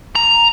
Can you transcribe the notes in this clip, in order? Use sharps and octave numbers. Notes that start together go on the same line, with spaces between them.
A#5